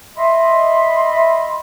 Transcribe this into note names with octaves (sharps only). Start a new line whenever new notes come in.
D#5 E5 B5 C6